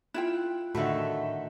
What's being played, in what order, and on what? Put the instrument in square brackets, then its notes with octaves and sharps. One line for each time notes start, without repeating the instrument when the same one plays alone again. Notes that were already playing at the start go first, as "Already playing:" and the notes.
[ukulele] E4 F4 G5 [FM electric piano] F#6
[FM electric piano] A2 B5 [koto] D3 D#3 A3 [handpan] F#4 E5